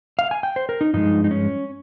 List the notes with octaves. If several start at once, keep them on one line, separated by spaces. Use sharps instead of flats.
F5
G#5
G5
C5
A#4
D#4
G2 F3 G#3 D#4
D#4
C#4